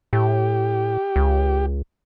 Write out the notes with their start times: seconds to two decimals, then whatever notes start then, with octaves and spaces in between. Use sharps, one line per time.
0.13 A2 G4
1.16 C#2